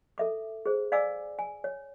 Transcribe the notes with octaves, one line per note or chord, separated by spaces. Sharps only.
A4 E5 D6
G#4 C5
D5 F5 G#5 D6 E6
G#5
C#5